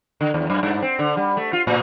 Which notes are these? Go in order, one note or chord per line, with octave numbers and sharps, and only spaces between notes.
D3
D#2
F#2
G2
C4
D3
G3
A3
F4
A2